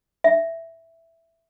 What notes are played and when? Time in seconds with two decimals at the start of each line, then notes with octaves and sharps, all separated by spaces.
0.24 E5